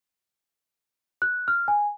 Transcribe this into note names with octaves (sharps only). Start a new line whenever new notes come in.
F#6
F6
G#5